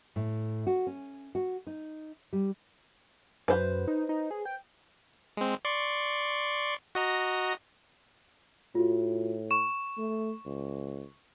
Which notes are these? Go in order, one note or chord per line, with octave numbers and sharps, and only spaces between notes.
A2
F#4
C#4
F#4
D#4
G3
F#2 B4 C5
D#4
D#4
G#4
G5
G#3 C4
D5 C6 C#6
F#4 D#5 A#5
A2 F4 F#4
C#6 E7
A3
C#2